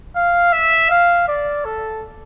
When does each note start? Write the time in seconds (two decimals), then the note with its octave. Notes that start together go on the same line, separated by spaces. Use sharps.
0.15 F5
0.52 E5
0.90 F5
1.28 D5
1.65 A4